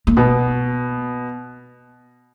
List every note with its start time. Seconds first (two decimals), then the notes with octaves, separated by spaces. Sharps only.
0.07 A#3
0.17 B2 B3